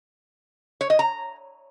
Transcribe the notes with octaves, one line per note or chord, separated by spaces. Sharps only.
C#5
D#5
A#5